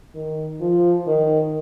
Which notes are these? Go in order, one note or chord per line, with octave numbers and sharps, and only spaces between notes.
D#3
F3
D#3